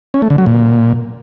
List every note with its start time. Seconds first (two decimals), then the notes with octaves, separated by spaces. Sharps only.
0.14 C#4
0.22 A3
0.30 D3
0.38 F#3
0.46 A#2